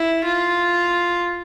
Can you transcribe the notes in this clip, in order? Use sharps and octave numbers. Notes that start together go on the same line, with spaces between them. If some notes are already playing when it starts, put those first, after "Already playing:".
Already playing: E4
F4